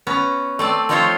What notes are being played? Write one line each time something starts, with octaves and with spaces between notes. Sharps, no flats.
B3 C#4 A#5
A3 C4 D5
F3 C4 D#4 F4 C5 C#5